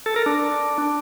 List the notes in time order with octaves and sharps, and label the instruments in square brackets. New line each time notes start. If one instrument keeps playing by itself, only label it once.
[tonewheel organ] A4
A#4
D4